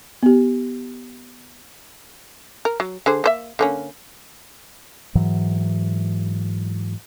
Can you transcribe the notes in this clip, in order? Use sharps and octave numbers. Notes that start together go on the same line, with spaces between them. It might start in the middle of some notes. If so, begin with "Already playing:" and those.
B3 G4
A#4
F#3
D3 G#4 C5
A#3 C5 E5
D3 A#3 C#4
G#2 E3 F#3